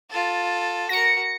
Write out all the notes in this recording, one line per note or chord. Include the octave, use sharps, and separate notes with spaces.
F4 A4
F#4 A#4 A#6 C#7